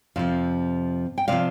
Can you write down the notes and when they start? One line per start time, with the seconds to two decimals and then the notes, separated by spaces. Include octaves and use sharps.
0.16 F2 C3 F3 C4 F5
1.18 G5
1.28 C3 F3 D5 F5